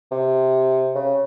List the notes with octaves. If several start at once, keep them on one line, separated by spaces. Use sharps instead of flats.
C3
C#3